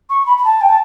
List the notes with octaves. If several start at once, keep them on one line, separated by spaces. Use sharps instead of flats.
C#6
B5
B5
A5
G5
A5